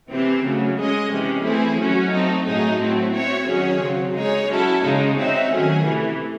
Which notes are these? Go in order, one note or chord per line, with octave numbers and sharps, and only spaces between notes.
C3 E3 C4
C#3 F#3 A3
G#3 C#4 G#4 D#5
C3 E3 G#3 C#4
E3 A3 C4 E4 G#4
F#3 C#4 F#4
A3 C4 D#4
A2 F#3 A3 D#4 G#4
F#3 A3 C4 E4
C4 F#4 C#5 E5
D#3 F#3 C#4 G#4 C#5
C#3 F#3 C4
G#3 D#4 G#4 C#5
F#3 C#4 E4 A4
C#3 G#3 D#4
C4 D#4 F#4 C#5 E5
D#3 F#3 A3 C#4 G#4
C3 E3 A3